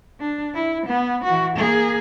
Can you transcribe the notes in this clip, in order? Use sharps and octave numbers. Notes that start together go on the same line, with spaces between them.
D4
E4
B3
E3 F#4
A#3 G#4